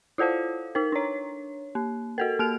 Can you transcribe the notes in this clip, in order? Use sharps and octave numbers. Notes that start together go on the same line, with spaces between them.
E4 F4 A4 C5 F5
D#4 A#4
D4 C#5
A#3
F#4 A4 A#4
A#3 F6 F7